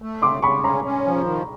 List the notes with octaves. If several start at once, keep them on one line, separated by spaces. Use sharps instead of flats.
A3
C#3 C6 D6
C#3 B5 C#6
C#4 A#5 C6
C#4
F3
D#3